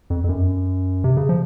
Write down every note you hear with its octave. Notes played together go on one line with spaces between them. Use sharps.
F2
F2
F#2
C3
C#3
F3